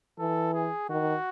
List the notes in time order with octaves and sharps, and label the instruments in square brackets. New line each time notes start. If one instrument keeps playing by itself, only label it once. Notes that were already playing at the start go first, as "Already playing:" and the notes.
[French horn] E3 [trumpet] A4
[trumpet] G#4
[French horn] D#3 [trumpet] F#4